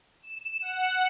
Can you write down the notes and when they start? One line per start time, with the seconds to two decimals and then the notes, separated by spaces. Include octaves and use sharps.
0.22 E7
0.61 F#5